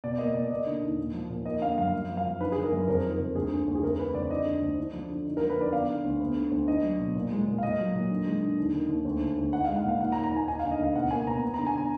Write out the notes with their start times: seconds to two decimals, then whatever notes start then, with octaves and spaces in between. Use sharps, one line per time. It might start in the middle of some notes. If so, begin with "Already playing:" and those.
0.04 B2 D5
0.18 A#3 D#5
0.34 B2 D5
0.50 A#3 D#5
0.66 D3
0.83 D#2
0.98 A#2
1.13 F3
1.30 A#2
1.45 A#3 D#5
1.61 D3 F5
1.77 F#2 F5
1.94 F#2
2.09 F3
2.17 F5
2.25 F#2
2.41 D4 B4
2.52 G#4
2.56 D#3
2.64 A#4
2.72 F#2
2.88 F2 A#4
3.04 D#3
3.11 A#4
3.19 F2
3.35 D2 G#4
3.52 D3
3.67 D2
3.75 G#4
3.82 F2 A#4
3.99 D3 B4
4.15 F2 D5
4.30 D4 D#5
4.46 D3
4.62 D2
4.78 D4
4.93 F3
5.09 D3
5.26 D#4
5.37 A#4
5.42 F3
5.50 B4
5.57 D3 D5
5.72 B3 F5
5.89 D3
6.04 D2
6.20 B3
6.36 D3
6.51 D2
6.68 D4 D#5
6.83 F#3
7.00 B2
7.16 A#2
7.31 G#3
7.47 A#2
7.58 F5
7.63 A#2 D#5
7.79 F#3
7.94 A#2
8.11 D3
8.26 G#3
8.42 D3
8.58 D#2
8.73 D#3
8.89 D#2
9.05 D2
9.21 D3
9.37 D2
9.52 D#4 F#5
9.64 F5
9.69 G#3
9.76 F#5
9.85 A#2 F5
9.99 D#2 F#5
10.12 A#5
10.16 D#3
10.24 A#5
10.32 D#2 G#5
10.47 D#4 G#5
10.59 F5
10.64 D3
10.71 D#5
10.79 D2 F5
10.95 B2 F#5
11.11 A#3 G#5
11.27 B2 A#5
11.42 B3
11.54 A#5
11.58 D3
11.67 G#5
11.78 A#5